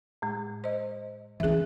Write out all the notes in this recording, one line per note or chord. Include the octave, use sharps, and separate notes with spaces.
A2 G#3
C5 D#5
E3 C#4 G#4 E5